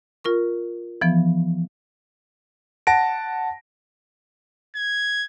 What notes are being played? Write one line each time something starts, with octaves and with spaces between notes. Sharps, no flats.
F4 A#4 C#6
E3 F3 B3
F#5 A5 A#6 D7
G#6